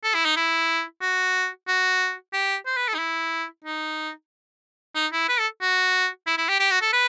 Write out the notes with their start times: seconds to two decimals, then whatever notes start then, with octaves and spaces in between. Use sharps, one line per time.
0.03 A4
0.14 E4
0.25 D#4
0.36 E4
1.02 F#4
1.68 F#4
2.33 G4
2.66 C5
2.77 B4
2.88 A4
2.95 D#4
2.99 E4
3.64 D#4
4.95 D#4
5.12 E4
5.28 B4
5.40 A4
5.61 F#4
6.27 E4
6.38 E4
6.49 G4
6.60 G4
6.71 F#4
6.82 A4
6.93 B4